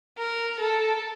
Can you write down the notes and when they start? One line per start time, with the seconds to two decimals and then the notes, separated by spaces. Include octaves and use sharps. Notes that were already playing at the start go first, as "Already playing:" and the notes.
0.19 A#4
0.60 A4